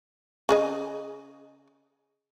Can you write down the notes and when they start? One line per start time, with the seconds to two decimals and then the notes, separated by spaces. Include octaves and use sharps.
0.49 C#3 G#4 D#5